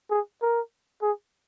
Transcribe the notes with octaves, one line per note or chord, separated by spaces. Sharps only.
G#4
A#4
G#4